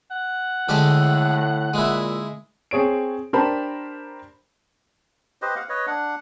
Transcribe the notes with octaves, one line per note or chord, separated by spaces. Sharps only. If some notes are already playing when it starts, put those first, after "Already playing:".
F#5
A2 D3 G#3 G4 A4
A#2 G#3 E4
C4 G#4 C#5 D7
D4 G4 A#4 C5 A5 B5
G4 B4 C5 D#5
F5 F#5
B4 C#5 D#5
D4 F#5